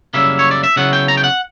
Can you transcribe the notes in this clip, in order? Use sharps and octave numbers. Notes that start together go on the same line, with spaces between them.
F#2 C#3 G3 A#3 E4 E5
C#5
D5
E5
C#3 F#3 B3 E4 F#5
G5
A#5
G5
F#5